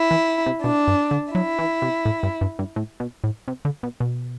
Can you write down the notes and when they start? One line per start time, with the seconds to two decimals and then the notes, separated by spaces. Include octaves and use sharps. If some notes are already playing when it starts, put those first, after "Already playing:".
Already playing: E4
0.11 E3
0.46 C3
0.64 B2 D4
0.88 G2
1.11 D3
1.34 F#3 E4
1.59 E3
1.82 C3
2.05 A2
2.23 G2
2.41 G2
2.59 G2
2.76 A2
3.00 B2
3.24 A2
3.48 C3
3.65 D3
3.83 B2
4.00 B2